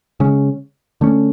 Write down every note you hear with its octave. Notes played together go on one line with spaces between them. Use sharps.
C#3 G#3 C#4
D3 A3 C#4